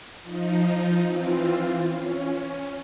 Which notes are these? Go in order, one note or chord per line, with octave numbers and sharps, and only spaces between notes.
F3 D#4
E3 C4 F4
C#4